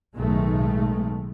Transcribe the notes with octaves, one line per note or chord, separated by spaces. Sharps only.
B1 A2 D#3 G#3 A3